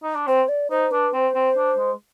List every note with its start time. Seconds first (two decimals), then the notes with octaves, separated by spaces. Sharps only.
0.03 D#4
0.15 D4
0.27 C4 C5
0.49 D5
0.70 D#4 C5
0.91 D4 B4
1.13 C4 C5
1.35 C4
1.57 D4
1.78 G#3